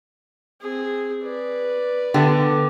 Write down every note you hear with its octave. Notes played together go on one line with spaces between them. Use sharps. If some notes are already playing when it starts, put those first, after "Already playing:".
C4 G#4
B4 D5
D3 B3 G4